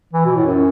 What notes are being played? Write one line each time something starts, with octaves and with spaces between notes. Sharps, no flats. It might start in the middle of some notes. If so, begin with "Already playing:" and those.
E3
B2
A2
F#2